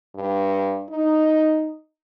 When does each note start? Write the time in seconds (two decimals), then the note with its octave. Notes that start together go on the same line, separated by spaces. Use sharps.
0.15 G2
0.90 D#4